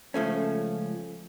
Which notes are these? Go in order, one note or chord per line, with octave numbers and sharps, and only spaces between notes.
C#2 F3 A3 C#4